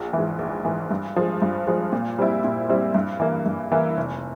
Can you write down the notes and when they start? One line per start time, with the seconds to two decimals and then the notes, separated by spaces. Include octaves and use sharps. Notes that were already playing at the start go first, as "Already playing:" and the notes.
Already playing: A#1
0.13 G#2 E3
0.39 A#1
0.65 G#2 E3
0.91 G2
1.16 F3 G#3
1.42 G2
1.67 F3 G#3
1.92 A#2
2.19 G3 C4 E4
2.44 A#2
2.69 G3 C4 E4
2.95 G2
3.20 E3 A#3 E4
3.46 G2
3.72 E3 A#3 E4
3.97 F1